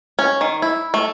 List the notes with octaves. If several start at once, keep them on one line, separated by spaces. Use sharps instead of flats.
C#4
D#3
E4
A3